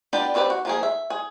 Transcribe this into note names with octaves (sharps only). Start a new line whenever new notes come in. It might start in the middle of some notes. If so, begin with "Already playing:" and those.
B3 D4 F4 G4 D5
D#3 C4 G4 B4 D5
F#4
F3 A#3 G#4
E5
G#4